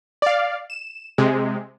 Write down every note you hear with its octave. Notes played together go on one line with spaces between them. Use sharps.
D5 F5
E7
C3 G#3